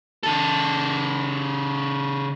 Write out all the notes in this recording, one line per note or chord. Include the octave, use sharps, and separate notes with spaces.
C#3 A4